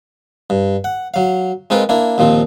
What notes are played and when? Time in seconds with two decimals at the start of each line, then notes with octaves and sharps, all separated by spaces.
0.50 G2
0.84 F#5
1.14 F#3 F5
1.70 G#3 C4 D#4 F4 A#4 B4
1.89 A#3 D4 E4
2.18 D#2 A#2 F3 C4